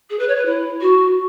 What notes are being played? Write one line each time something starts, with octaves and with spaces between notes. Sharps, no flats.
G#4
B4
C#5
B4
E4
F#4